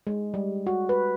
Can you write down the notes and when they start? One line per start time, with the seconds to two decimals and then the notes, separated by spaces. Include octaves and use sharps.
0.07 G#3
0.34 G3
0.67 F#4
0.89 B4